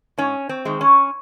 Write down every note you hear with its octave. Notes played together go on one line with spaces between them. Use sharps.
G#2 C#4
C4
D#3 G#3
C#4